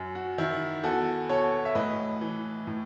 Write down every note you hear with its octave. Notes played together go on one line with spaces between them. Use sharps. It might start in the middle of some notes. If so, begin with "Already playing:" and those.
Already playing: F#2
F#4
D#3 E4
E2 F#4 A4
B2 A4 C#5
E5
A2 B4 D#5
E3
A2